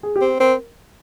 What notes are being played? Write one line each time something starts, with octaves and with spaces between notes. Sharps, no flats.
G#4
G4
C4
C4 A#4